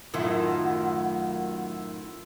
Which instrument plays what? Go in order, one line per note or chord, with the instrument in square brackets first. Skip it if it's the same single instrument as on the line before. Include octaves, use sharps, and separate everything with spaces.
[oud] F#2 A2 D#3 [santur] E4 F4 [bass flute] F#5